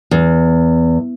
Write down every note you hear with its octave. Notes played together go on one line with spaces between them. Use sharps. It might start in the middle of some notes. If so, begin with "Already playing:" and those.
E2